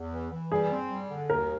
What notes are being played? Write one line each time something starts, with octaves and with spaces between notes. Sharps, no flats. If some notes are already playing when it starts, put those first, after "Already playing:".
Already playing: E2
E3
E3
G3 G#4
C4
G3
D3
D#2 A#4